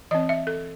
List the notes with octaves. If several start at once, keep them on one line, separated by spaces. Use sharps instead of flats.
E3 C4 D#5
E5
A4